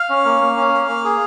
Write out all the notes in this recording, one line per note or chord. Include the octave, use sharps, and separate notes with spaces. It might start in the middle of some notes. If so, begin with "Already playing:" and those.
Already playing: F5
C#4
A#3
A#3
C#4
A#3
A#3
G#4